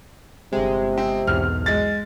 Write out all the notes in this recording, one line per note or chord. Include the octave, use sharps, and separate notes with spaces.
G1 C3 G#3
C4
B1 E2 G#2 F6
G#3 A6